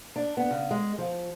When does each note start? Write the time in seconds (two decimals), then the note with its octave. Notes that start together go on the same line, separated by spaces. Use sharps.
0.16 D4
0.37 B3
0.51 C#3
0.71 G#3
0.98 F3